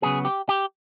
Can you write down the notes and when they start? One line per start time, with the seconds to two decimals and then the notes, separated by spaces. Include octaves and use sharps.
0.02 C#3 F#3 B3 G#4
0.25 G4
0.49 G4